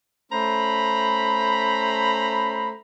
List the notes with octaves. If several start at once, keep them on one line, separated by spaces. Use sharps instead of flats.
A3 C#4 C5 A#5 B5